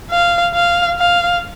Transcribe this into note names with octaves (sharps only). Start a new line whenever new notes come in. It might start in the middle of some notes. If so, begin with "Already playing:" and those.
F5
F5
F5